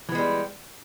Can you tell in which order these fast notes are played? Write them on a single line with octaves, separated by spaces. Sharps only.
E3 B3 G#3 G3